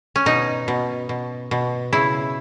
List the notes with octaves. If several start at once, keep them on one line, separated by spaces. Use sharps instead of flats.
C#4
B2 D#4
B2
B2
B2
C#3 E4